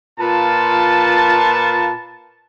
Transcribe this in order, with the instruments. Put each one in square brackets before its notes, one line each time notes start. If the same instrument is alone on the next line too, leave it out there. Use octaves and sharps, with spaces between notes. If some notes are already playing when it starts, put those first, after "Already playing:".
[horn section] A#2 F4 B4 A5